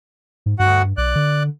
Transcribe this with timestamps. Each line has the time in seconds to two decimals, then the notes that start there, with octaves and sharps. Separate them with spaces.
0.46 G#2
0.59 D2 G2 F#4 F#5
0.97 B1 D5 F#6
1.15 D3